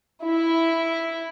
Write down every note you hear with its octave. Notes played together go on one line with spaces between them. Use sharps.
E4